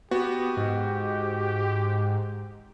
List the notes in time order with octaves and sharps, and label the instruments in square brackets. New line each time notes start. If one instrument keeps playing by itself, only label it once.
[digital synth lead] B3 [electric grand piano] F#4 [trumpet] G4
[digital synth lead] G#2